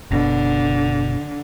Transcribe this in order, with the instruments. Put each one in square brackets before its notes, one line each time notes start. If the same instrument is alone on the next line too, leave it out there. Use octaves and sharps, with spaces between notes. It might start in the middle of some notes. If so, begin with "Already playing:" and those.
[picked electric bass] F#1 B2 [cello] D3